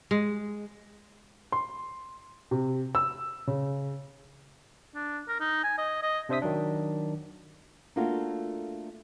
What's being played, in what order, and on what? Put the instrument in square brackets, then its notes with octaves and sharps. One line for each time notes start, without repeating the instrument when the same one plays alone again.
[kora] G#3
[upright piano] C6
C3
E6
C#3
[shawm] D4
A#4
D#4
G#5
D#5
D#5
[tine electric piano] C3 D4 C5 E5 D#6 B6
D#3 F#3 D4
[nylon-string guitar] A3 A#3 D4 F4 F#4 A4